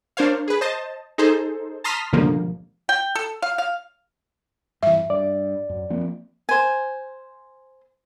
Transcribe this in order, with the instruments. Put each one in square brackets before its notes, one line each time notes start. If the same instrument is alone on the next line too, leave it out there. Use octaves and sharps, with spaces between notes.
[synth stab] D4 A#4 C5 C#5 F5
G#4 B4
C5 D#5 A5
D#4 G#4 A4 C5
A5 A#5 C6 D#6 F6 B6
C#2 G2 B2 D3 F3 A#3
[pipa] G5
A4
F5
F5
[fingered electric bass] G2 E3 [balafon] E5
[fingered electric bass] G2 [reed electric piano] D5
[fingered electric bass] F#2
F3 A#3 C4
[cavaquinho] C5 G#5